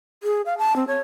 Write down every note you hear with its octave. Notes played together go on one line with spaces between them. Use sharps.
G#4
F5
A5
C4
C#5